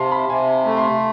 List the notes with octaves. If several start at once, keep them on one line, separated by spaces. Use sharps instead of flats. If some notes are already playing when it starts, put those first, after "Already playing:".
Already playing: C3 F5 A5 C6
B5
C3 G#5
A3
C6